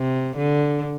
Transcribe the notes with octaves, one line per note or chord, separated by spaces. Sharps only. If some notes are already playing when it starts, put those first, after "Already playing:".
Already playing: C3
D3